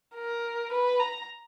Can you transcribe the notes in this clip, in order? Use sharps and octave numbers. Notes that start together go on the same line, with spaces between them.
A#4
B4
A#5